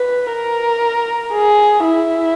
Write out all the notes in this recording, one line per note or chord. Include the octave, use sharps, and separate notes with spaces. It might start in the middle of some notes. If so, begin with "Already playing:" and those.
Already playing: B4
A#4
G#4
E4